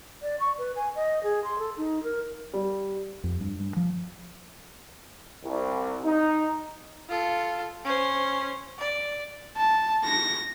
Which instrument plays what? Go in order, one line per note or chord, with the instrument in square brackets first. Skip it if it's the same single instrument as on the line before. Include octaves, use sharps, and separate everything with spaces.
[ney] D5
C#6
B4
G#5
D#5
G#4
C6
A4
D#4
A#4
[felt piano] G3
[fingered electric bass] F2
G2
G2
F3
[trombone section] C2
D#4
[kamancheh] F4 A4
C#4 C5
D5
[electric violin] A5
A#6